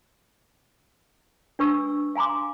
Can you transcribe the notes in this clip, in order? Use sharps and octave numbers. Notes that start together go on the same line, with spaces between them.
D4 B4 C#6 E6
F5 G#5 A#5 C6 D6